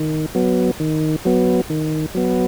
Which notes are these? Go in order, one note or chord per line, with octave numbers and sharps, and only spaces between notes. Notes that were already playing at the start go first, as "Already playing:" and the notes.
Already playing: D#3
F#3 B3
D#3
F#3 B3
D#3
F#3 B3